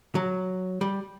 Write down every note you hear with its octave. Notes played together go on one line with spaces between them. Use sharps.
F#3
G3